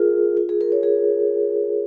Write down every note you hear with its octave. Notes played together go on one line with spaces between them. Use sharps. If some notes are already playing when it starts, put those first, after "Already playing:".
Already playing: F4 G#4 A#4
F4
G#4
A#4
C#5
G#4